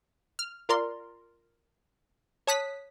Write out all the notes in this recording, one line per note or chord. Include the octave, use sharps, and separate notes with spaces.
F6
F4 A#4 D5 A#5 C6
C#5 A5 D#6 F#6 B6